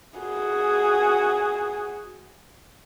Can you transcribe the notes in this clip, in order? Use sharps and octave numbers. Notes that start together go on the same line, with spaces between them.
F#4 G#4